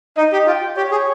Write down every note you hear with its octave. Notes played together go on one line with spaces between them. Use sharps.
D#4 D#5
G4
F4 G5
G4 C#5
G#4